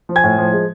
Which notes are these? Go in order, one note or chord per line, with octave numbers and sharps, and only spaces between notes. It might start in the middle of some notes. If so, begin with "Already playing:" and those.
F3
G#5 G#6
A2
F3
G#3